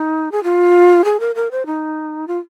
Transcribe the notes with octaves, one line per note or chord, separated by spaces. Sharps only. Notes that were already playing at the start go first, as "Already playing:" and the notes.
Already playing: D#4
G#4
F4
G#4
A#4
A#4
C5
D#4
F4